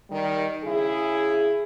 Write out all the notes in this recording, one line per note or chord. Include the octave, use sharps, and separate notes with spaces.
D#3 G3
C#3 E4 G#4